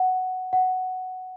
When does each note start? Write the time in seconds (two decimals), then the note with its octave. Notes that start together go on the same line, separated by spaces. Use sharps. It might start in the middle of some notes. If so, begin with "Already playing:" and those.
Already playing: F#5
0.53 F#5